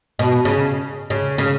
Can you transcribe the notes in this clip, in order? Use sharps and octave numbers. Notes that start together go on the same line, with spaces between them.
B2
C#3
C#3
C#3